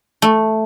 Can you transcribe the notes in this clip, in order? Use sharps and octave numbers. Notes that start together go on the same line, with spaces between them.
A3